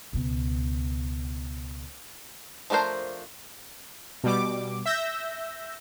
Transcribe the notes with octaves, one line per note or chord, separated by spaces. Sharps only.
C#2 B2
F3 A3 D4 A#4 C5
B2 G3 D6
E5 E6 G6 A#6